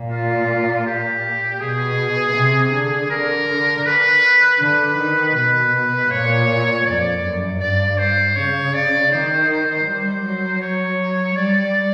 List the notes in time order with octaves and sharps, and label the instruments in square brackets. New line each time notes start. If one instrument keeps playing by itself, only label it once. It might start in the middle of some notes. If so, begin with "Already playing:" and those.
Already playing: [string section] A#2
[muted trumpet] F4
G4
[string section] B2 [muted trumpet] G#4
[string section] C3
D3
[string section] D3 [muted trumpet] A#4
[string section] D3
[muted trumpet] B4
[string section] D3 [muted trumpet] B4
[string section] D#3
[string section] B2 [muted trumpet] B4
[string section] A#2 [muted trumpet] C#5
[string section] F2 [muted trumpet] D5
[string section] F#2
[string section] G2 [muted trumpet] D5
[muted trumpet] C5
[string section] C#3 [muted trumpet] C#5
[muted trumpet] D5
[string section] D#3 [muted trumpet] C5
[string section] G3 [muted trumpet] C5
[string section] F#3
[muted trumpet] C#5
[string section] G3 [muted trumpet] D5